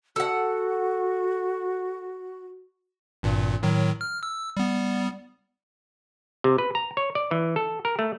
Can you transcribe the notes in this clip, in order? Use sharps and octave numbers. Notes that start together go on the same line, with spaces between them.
F#4 A4 F#5
G#1 G2 A#2
A2 D#3 F#3
F6
E6
G3 B3
C3
B4
A#5
C#5
D5
E3
A4
A#4
A3